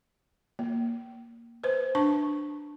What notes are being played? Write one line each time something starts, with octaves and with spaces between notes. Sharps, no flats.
A#3
B4 C5
D4 A5 C#6